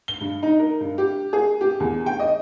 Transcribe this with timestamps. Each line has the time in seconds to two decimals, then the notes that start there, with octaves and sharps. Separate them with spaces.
0.08 G7
0.21 G2
0.43 D#4
0.60 A#4
0.81 G2
0.98 G4
1.33 G#4
1.61 G4
1.80 E2
2.06 G5
2.20 D#5